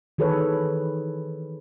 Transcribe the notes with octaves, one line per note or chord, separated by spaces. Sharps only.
D#3 E3 G#4 A4 B4 C#5